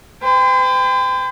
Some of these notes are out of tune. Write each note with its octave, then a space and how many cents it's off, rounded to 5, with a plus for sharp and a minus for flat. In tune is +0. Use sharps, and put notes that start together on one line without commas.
C5 -45 G5 +25